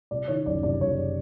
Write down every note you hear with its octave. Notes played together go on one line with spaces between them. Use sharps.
C3 D5
D#3 C#5
F#1 D5
C3 D5
F#1 C#5